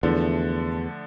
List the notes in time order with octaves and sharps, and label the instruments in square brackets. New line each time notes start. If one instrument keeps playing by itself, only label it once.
[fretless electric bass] E2 [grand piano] D3 F3 A3